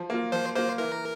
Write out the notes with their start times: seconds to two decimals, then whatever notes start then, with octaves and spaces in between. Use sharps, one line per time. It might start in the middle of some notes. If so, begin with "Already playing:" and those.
Already playing: F3
0.10 A#3 F4
0.32 F3 C5
0.56 A#3 F4 C5
0.78 E3 A#4